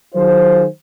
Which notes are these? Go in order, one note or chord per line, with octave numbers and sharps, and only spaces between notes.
D#3 F#3 F4 G#4 C5